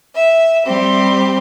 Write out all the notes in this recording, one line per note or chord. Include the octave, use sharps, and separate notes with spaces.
E5
G3 C4 G4